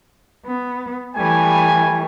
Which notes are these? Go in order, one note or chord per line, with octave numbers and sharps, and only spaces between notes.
B3
E3 G3 A3 G#5